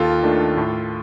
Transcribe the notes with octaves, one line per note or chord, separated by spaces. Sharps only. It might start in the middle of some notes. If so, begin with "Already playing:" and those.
Already playing: D#2 F4 A4
D#3 A3 D4
A2